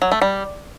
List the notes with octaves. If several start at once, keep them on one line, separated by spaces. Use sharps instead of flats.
F#3
A3
G3